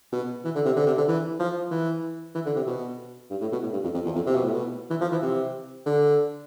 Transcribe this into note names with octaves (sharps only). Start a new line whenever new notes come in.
B2
E3
D3
C3
D3
C3
D3
E3
F3
E3
E3
D3
C3
B2
G2
A2
B2
A2
G2
F2
F2
E2
F2
C3
B2
A2
B2
E3
F3
E3
C3
D3